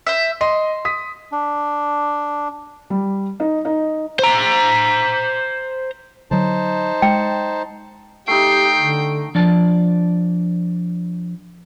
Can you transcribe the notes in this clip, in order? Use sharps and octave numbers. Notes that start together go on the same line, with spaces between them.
C5 E5
D#5 C6
D#6 B6
D4
G3
D#4
D#4
C5 A#5
D3 F#3 D#4 C5 A5
G#3 G5
A3 D#4 G4 G5 C7
D3
F3 D4 D5 A5